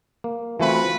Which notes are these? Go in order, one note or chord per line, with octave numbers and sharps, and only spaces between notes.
A#3
E3 A3 C4 F4 F#4 B4